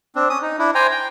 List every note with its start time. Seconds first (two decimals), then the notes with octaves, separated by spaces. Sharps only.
0.15 C4 D4
0.29 C#4 D#6
0.42 D#4
0.59 D4 E4
0.75 C5 G5 G#5 A#5
0.91 G5